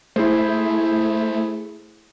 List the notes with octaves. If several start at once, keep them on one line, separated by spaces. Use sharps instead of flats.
A3 E4 G#4 C5